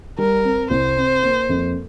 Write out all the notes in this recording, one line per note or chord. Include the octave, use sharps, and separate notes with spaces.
G3 A#4
C4
C2 C5
C3
A#3
F2